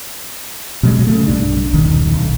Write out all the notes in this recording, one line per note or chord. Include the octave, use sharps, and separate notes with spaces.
B2 F#3 G#3
C#3 A3
B1 G2 D4
D#1 B1 D#3
B1